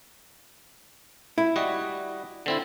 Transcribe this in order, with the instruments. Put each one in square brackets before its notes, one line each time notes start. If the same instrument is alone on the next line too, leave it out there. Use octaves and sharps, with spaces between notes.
[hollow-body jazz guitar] E4
[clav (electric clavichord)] G3 F#4 D#5
D3 C4 E4